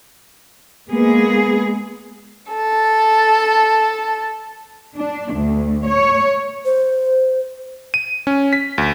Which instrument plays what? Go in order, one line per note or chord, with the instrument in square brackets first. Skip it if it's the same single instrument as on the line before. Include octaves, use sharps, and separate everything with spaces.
[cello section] G#3 A#3 B3 G#4
[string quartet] A4 A5
[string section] D4
D2
C#5
[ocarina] C5
[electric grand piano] D#7
C#4
B6
D2